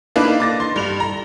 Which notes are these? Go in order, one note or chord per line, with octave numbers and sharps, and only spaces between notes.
A#3 D4 D#4 B4
D6 A6 A#6
C6
G2 F7
A#5